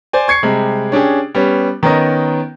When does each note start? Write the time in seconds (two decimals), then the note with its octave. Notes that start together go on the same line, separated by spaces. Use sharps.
0.13 C5 D5 G#5
0.28 C#6 G#6 C7 C#7
0.43 C3 G3 G#3
0.92 C#4 D4 G4 G#4
1.35 G3 B3 C#4
1.83 D#3 B3 C#4 A#4 D#5